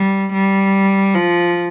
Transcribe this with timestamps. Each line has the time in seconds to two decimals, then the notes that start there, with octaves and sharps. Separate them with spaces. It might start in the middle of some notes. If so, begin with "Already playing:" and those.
Already playing: G3
0.34 G3
1.15 F3